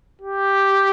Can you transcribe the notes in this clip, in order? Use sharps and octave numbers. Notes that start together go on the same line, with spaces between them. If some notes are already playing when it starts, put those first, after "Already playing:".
G4